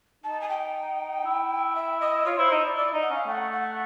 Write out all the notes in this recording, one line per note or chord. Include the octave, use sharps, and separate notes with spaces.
D#4 A5
G#5
G5
E4
E5
D#5
F4 C#5
E4 C5
D#4
E4 D5
E4 D5
D#4
F#5
C#4 F5
A3 F#5 G5
F#5